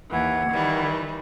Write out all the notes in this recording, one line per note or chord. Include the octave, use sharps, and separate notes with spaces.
D#2 E3 F#5 G#6
D#3 E3 G3